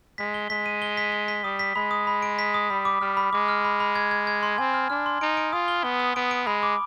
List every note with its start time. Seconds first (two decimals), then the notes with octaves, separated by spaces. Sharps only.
0.18 G#3 B6
0.34 G7
0.50 G#3 B6
0.66 D#7
0.82 G7
0.97 B6
1.12 G7
1.28 B6
1.44 G3 D#6
1.59 B6
1.76 G#3 B5
1.91 D#6
2.07 B5
2.22 D7
2.39 B6
2.54 D#6
2.70 G3 B5
2.85 D6
3.01 G3 F6
3.17 B5
3.33 G#3 D6
3.49 F6
3.65 B5
3.80 B5
3.95 G#6
4.11 G#6
4.27 G#6
4.43 C6
4.58 C4 G#5
4.74 F6
4.90 D4 F6
5.06 C6
5.21 D#4 D7
5.37 D7
5.53 F4 D#6
5.68 G7
5.84 B3 G7
6.00 D#6
6.16 B3 D7
6.31 D7
6.47 G#3 B5
6.63 D6